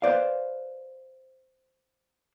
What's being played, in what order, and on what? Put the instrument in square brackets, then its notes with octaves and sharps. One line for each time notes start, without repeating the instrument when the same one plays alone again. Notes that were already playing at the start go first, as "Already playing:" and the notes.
[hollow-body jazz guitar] B4 C5 D5 F5